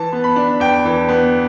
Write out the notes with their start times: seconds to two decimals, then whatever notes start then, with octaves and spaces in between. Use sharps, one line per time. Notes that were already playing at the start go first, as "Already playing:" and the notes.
Already playing: E3 A5
0.12 B3
0.24 B5
0.36 D4
0.60 E2 G5
0.85 E3
1.09 B3